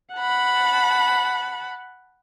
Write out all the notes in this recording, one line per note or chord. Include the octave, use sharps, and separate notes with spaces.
F#5 A5 B5